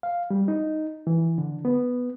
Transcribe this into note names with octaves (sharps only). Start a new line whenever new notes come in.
F5
G3
D#4
E3
D3
B3